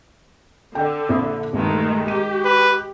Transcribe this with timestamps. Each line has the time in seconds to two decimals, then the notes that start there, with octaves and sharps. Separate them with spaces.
0.75 D3 D5 G5
1.09 A#1 E4 D#6
1.53 A#1 G2 D#3 G#3 A3
2.07 G#3 G4 G#4 D#7
2.45 B4